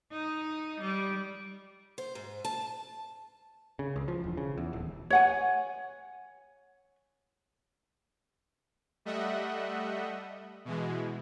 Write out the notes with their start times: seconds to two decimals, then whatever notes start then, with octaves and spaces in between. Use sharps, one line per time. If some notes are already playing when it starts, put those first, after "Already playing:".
0.12 D#4
0.80 G3
1.98 C5
2.15 G#2
2.45 A5
3.79 C#3
3.96 C#2
4.08 F3
4.24 E1
4.37 C#3
4.57 E2
4.73 D#1
5.10 C#5 F#5 G#5
9.05 G3 A3 D#5 E5 F#5
10.65 B2 E3 G#3